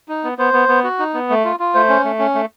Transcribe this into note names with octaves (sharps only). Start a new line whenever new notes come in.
D#4
B3
B3 C5
B3
B3
F#4
D#4
B3
A3
F4
F4
A3 C5
C#4
A3
C#4
A3